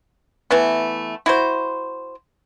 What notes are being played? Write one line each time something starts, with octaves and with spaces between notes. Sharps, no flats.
E3 A3 B3
E4 F#4 C5